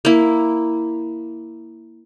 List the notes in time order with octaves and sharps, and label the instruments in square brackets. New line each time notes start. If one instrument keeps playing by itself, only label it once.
[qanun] A#3 E4